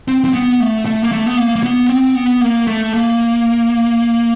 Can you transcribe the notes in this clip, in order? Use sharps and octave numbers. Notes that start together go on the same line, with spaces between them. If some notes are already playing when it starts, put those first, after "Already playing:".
C4
C4
B3
A3
A3
A#3
A3
B3
A#3
A#3
B3
C4
B3
A#3
A3
A#3